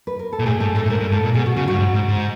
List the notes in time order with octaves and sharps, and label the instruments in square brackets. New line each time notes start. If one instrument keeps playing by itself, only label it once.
[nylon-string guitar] B4
A#4
A4
[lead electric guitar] A#2
[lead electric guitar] A2 [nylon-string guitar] G#4
[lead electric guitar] G#2 [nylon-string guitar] A4
[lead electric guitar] A2 [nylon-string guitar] A4
[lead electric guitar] A2
[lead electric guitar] G#2 [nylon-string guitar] A#4
[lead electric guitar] G2
[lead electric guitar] G#2 [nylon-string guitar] A4
[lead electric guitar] A#2
[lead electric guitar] B2 [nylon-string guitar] G#4
[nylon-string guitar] F#4
[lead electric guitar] C#3 [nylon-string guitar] F#4
[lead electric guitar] G2 [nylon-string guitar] F#4
[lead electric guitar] G#2
G#2
G#2